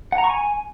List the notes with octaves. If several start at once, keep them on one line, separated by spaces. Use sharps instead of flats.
F#5
A#5
C#6
G#5